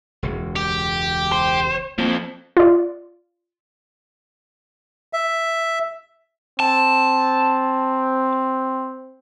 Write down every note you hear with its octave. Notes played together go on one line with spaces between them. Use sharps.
E1 C#2
G4
C5
F3 A#3 C4
F4 D5
E5
C4 A5